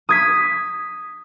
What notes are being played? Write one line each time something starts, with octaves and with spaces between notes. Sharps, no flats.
D#6 G#6 B6